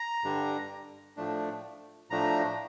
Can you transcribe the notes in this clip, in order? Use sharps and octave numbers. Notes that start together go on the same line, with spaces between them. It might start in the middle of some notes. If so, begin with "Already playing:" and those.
Already playing: A#5
G2 D3 G3 D4
A2 F3 A3 D4
A2 F3 A3 D4 A#5